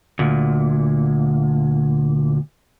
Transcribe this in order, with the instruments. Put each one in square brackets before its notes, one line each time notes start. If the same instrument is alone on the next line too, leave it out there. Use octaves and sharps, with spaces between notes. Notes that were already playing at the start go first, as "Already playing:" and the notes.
[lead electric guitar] D2 A#2